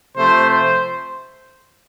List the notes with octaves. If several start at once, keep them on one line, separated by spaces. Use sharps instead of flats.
C3 F3 A3 C5
C5